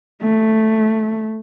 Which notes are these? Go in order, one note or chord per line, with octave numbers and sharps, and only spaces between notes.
A3